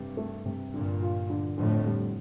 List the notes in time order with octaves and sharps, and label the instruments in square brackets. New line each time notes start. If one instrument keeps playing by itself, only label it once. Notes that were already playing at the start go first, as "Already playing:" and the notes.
Already playing: [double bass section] G2 [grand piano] C3
[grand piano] A3
C3
[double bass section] G2 A#2 [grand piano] D3
[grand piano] F4
D3
[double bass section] F2 A2 [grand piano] D3
[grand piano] G3